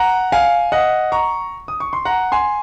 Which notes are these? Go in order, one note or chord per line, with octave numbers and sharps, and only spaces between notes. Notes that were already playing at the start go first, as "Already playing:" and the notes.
Already playing: F#5 A#5
F5 G#5
D#5 F#5
A#5 C#6
D#6
C#6
C6
F#5 A#5
G#5 C6